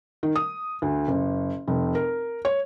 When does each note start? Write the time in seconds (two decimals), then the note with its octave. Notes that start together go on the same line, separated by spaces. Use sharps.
0.23 D#3
0.36 D#6
0.82 D2
1.08 F#1
1.68 F1
1.95 A#4
2.45 C#5